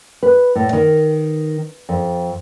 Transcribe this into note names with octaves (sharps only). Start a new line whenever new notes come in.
B4
A2
D#3
F2